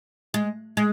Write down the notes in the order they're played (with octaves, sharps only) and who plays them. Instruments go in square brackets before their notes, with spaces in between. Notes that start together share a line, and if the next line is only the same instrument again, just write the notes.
[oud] G#3
G#3